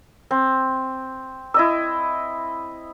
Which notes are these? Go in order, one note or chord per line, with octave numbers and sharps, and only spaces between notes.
C4
E4 D#5 E6